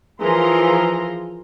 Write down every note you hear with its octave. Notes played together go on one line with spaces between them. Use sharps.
E3 F3 G#4 A#4 A#5 C6